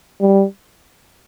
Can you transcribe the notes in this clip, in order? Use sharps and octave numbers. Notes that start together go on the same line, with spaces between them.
G3